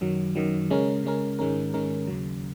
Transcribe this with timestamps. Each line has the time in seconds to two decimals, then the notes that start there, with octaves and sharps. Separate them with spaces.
0.01 F#2 D#3 F#3
0.35 F#2 D#3 F#3
0.70 C#3 G#3 C#4 A#4
1.04 C#3 G#3 C#4 A#4
1.39 G#2 D#3 G#3 C#4 A#4
1.74 G#2 D#3 G#3 C#4 A#4
2.07 D#2 C#3 F#3